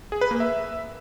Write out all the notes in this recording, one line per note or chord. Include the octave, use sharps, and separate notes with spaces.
G#4
B4
A#3
E5